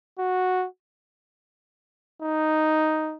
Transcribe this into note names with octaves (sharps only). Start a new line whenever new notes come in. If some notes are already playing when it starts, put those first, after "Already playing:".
F#4
D#4